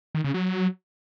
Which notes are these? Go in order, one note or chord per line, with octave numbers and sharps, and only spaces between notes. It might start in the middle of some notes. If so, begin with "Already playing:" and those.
D#3
C#3
F#3